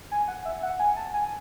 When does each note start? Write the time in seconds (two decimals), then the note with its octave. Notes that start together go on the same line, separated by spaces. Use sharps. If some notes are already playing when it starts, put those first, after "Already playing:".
0.11 G#5
0.28 F#5
0.45 E5
0.63 F#5
0.79 G#5
0.97 A5
1.14 G#5